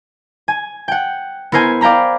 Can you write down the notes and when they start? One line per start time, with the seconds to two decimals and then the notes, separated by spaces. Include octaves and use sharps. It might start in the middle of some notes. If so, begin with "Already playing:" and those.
0.48 G#5
0.88 F#5 G5
1.52 B3 E4 A#4 C5 G#5
1.81 D5 F5 G5 A#5 B5